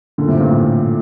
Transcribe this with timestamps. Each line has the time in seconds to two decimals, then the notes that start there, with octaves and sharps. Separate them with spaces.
0.18 A#2 D3
0.28 A2 C3
0.39 G2 A#2
0.51 A2